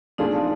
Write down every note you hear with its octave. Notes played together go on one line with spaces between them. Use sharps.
F3 A3 D4 D#4 F4 G#4